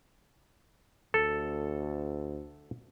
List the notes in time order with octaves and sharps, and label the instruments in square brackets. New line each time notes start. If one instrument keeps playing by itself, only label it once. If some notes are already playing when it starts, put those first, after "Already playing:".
[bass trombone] D2 [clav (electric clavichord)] A4